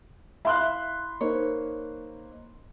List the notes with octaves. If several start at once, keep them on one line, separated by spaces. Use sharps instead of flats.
E4 E5 F5 B5 C6 F#6
A#3 D#4 C5 C#5